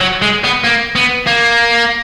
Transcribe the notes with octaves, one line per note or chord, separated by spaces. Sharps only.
F#3
G#3
B3
A#3
B3
A#3